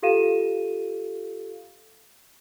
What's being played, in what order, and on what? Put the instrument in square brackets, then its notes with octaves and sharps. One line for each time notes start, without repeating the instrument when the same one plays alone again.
[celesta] F4 G4 A4 F5 D#7 E7